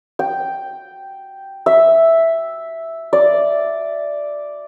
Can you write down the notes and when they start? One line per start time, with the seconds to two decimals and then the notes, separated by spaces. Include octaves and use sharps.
0.19 G5
1.66 E5
3.13 D5